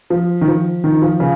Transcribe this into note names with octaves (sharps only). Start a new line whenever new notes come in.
F3
D#3
F3
D#3
F3
C#3